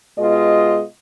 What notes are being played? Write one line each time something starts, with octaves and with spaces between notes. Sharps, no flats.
B2 G#3 F4 D#5